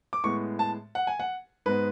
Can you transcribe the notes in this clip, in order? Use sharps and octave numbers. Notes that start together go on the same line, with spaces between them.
D6
A2 G#3 B3 C#6
A5
F#5
G#5
F#5
G#2 G#3 B3 B4